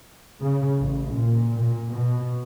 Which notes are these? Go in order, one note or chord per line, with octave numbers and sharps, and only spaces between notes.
C#3
A1
A#2
A#2
B2